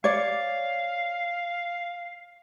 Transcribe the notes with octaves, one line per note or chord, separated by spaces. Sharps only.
C#5 D5 F5